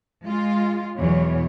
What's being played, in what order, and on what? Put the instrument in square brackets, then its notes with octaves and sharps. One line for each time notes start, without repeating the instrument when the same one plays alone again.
[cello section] G#3 F4
E2 B2 E3 F#3 C#5